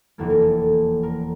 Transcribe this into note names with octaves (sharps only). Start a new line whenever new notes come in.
F1 E2 E3 A#3 A4
A#4
A4
A#4